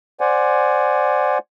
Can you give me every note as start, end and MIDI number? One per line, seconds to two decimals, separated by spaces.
0.20 1.38 72
0.20 1.38 74
0.20 1.38 78
0.20 1.38 80